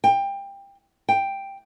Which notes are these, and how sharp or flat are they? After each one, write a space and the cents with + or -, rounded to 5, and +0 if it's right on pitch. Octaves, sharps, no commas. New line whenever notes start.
G5 +20
G5 +5